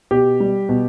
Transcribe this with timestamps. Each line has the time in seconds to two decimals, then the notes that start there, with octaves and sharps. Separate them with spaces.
0.11 B2 G4
0.40 G3
0.69 B2